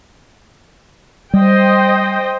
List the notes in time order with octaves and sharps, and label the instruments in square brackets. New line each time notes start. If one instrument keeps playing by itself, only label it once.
[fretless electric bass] G3 [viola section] C5 D#5 G5